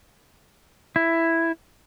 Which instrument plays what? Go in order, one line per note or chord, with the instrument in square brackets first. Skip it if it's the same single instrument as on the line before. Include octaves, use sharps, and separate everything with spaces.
[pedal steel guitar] E4